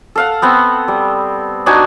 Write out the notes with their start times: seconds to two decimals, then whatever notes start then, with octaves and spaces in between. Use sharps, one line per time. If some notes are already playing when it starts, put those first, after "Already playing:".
0.16 A4 F5 F#5
0.42 B3 C4 F#5
0.88 G3
1.66 D4 D#4 F#4 G#5